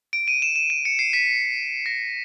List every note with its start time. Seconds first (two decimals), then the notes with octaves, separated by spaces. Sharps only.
0.13 D7
0.28 D#7
0.42 E7
0.56 E7
0.70 D#7
0.85 C#7
0.99 C7
1.13 B6
1.86 A#6